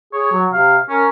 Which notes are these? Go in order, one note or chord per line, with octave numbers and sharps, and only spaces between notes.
G#4 C#5
F#3
C3 F5
C#4 A#4